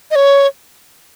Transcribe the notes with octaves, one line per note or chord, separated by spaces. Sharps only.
D#5
C#5